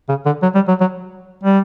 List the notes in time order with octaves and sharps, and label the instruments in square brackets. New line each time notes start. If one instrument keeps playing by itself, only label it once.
[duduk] C#3
D3
F#3
G3
F#3
F#3
G3